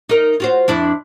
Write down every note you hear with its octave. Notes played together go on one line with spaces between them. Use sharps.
D#4 A#4
F4 F#4 C5
F2 D4 E4